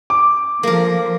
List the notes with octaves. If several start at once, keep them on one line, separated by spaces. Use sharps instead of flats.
D6
F3 A#3 A#4